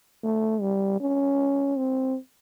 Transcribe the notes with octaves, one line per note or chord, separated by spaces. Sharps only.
A3
G3
C#4
C4